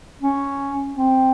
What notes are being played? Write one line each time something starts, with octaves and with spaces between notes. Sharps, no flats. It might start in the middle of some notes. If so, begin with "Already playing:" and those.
C#4
C4